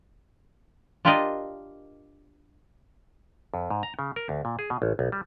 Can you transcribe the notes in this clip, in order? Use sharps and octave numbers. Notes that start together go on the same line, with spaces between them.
D4 F4 G4 A#4 D5 D#5
F2
G#2
A#5
C#3
A#4
D2
A#2
G#4
B2
A1
B1
G3